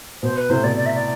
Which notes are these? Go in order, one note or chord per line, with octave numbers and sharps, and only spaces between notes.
B2 C5
B4
A2 C3 C5
B2 D5
D5
E5
D5